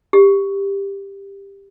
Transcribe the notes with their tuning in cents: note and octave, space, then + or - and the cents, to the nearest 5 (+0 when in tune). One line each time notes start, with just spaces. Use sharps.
G4 +10